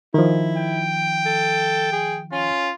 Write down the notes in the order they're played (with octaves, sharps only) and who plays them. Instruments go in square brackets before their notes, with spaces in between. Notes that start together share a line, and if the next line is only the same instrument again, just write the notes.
[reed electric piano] D#3 F3 [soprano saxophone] E4
[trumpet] G5
[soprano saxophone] A4
G#4
[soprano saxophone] C#4 [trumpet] F4